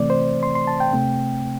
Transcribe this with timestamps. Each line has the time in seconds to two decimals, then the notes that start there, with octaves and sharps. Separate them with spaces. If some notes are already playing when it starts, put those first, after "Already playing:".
Already playing: C3 E3 A3 C4 D5
0.10 C5
0.43 C6
0.55 C6
0.67 A5
0.80 G5
0.93 C3 A3 C4